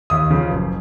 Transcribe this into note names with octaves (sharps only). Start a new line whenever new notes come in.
D#2 D#6
C#3 F3
F#1